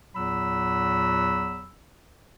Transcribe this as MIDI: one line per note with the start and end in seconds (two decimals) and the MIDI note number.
0.15 1.70 40
0.15 1.70 46
0.15 1.70 54
0.15 1.70 83
0.15 1.70 88